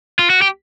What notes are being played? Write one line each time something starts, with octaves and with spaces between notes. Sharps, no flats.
F4
F#4
G4